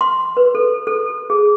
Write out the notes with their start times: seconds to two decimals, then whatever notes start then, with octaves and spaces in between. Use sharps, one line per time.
0.01 C6
0.37 B4
0.55 A4
0.87 A4
1.30 G#4